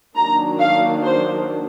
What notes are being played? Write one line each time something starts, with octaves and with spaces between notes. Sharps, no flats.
D#3 F#3 A#3 D4 A#5
F5
C5